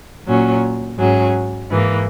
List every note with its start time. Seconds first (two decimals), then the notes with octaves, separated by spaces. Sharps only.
0.27 A#2 F#3 C#4
0.97 G#2 F#3 C#4 G#4
1.69 G#2 E3 A#3